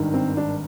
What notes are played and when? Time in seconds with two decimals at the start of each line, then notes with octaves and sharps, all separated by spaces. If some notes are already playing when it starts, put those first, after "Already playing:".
Already playing: G#1 G2 D#3
0.14 C4
0.37 D4